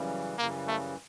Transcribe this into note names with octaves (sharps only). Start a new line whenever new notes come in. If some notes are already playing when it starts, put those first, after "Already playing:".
Already playing: F#2 C#3 E3 G3
F#2 C#3 E3 G3 A#3
A3